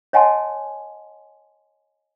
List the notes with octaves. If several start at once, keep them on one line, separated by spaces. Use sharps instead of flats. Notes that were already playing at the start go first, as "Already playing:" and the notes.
C#5 D#5 F#5 G#5 A5 C6